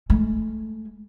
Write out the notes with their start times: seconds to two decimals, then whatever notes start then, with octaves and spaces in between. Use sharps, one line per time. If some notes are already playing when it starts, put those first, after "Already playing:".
0.10 G#3 A3